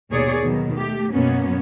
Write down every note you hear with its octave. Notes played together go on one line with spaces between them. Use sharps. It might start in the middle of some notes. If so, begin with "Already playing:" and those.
D#2 B2 A#3 G#4 C#5 D5
B2 D#3 F#3
A3 G4
F#2 B2 F#3 A#3 B3 C#4